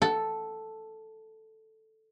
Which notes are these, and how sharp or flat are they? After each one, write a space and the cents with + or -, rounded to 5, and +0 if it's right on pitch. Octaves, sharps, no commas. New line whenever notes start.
A4 +0 F#5 +15